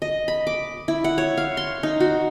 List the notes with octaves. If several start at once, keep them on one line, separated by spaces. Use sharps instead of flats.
D#5
B5
D6
E4
F#5
C#5
F5
C6
D#4
F#4